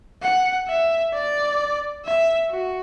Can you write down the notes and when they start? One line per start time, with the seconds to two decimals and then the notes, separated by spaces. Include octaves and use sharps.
0.22 F#5
0.68 E5
1.14 D5
2.05 E5
2.51 F#4